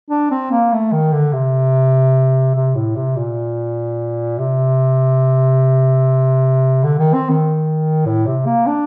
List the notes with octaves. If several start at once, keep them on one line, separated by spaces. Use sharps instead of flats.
D4
C4
A#3
A3
D#3
D3
C3
C3
A2
C3
A#2
C3
D3
D#3
C4
D#3
A2
C3
A#3
D4